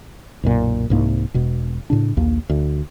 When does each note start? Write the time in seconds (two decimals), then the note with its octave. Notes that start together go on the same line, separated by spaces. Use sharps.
0.43 B1 F#2 A#2
0.90 C2 G#2 A#3
1.34 E1 B2
1.90 A2 C#3 D4
2.17 A#1 D#2 A#3
2.49 D2